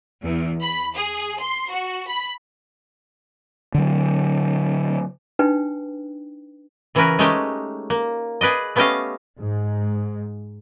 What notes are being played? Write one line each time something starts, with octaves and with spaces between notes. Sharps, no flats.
E2
B5
G#4
C6
F#4
B5
D3 F#3
D4 D#4 B4 G5
C#3 E3 C#4 F#4 A#4 B4
G#3 A3 C#4 D#4 G4
A#3
G#4 B4 D5 D#5
A3 B3 C#4 G4 D#5 F5
G#2